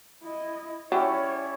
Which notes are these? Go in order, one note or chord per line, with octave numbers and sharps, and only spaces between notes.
E4 D#5
F#3 C#4 E4 G4 C#5 D5